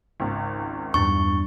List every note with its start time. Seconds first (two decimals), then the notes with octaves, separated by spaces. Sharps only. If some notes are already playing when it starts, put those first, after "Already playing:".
0.20 G#1 C#2
0.94 E2 G2 D4 C#6 A6